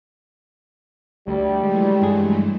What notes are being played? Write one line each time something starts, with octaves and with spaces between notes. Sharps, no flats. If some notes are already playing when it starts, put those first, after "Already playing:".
D2 G3
E3 F#3 G#3 A3
G2 G#4